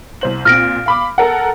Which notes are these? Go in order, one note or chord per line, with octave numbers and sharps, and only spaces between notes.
C2 C5 F#7
A#2 C4 F6 A#6 D7
F5 B5 D6
A4 A#4 F#5